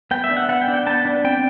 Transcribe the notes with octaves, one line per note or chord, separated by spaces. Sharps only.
B3 G5
E5
D4
F#5
B3 F#5
G5
D4
G5
B3 A5
D4
C4 G5